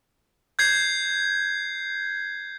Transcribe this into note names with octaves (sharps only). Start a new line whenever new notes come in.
G6 G#6 C7